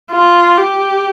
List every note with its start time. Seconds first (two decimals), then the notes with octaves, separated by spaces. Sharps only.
0.11 F4
0.58 G4